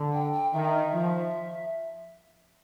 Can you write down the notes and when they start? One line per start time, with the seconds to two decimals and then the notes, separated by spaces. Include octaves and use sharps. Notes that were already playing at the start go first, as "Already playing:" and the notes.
Already playing: D3
0.14 G5
0.33 G5
0.53 D#3 E5
0.93 F3